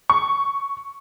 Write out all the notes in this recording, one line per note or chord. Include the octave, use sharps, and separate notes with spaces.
C#6